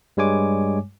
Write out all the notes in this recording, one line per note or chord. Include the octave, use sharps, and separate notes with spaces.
G2 G3 G#3 C#5 G#5 D6